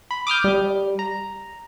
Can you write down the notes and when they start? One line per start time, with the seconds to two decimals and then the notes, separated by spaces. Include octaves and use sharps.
0.11 B5
0.27 D6 D#6 F6 G6
0.44 G3
0.99 A#5